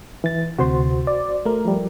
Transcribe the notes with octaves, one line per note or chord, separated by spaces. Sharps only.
E3 A6
D2 C3 F#4 C5 C6
D5
A3 A#4
F3 G3